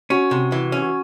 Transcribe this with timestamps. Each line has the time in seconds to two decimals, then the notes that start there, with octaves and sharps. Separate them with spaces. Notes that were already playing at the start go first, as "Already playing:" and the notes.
0.10 C#4 F#4
0.31 C3
0.52 E3
0.72 C#4
0.82 F#4